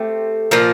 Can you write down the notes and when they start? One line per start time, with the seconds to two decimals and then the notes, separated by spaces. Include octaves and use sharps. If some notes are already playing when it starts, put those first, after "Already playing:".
Already playing: A3 C4 G4
0.51 A#2 F3 A#3